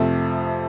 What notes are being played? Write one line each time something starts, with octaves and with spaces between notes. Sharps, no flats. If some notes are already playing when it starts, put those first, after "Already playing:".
Already playing: F2 C3 F3 A3